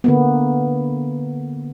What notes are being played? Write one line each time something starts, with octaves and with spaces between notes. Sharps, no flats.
D3 A#3 B3